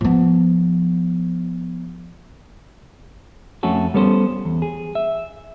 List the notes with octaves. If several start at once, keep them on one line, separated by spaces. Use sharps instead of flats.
F3 B3
F2 A3 C#4 F#4 A4
G3 B3 C#4 A4 B4 C5
E2
G#4
E5